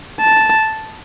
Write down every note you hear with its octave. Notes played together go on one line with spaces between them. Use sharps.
A5